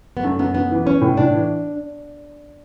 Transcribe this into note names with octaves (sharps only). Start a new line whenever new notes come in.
B3
F#2 A3
F#2 B3
F#2 B3
E3
B3 C#4
A2
A2 D4
E3